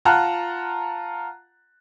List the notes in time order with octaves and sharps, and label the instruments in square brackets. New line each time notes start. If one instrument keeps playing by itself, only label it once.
[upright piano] F4 F#5 A5 A#5 F6 F#6